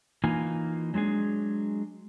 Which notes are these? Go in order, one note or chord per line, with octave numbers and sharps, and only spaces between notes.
E3 A#3 D#4 F4 G#5
F#3 G#3 D4 G#4